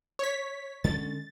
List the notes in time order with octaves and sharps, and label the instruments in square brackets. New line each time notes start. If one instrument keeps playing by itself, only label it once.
[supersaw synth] C#5 B6
[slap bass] D3 G#3 C#4 [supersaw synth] A6